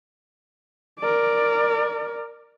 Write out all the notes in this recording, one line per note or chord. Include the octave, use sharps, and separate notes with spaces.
A#4 D5